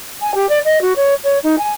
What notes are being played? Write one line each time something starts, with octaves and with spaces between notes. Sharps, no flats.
G#5
G4
D5
D#5
F#4
C#5
C#5
D#4
G#5